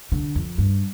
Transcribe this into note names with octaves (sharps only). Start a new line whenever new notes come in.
D3
F2
G2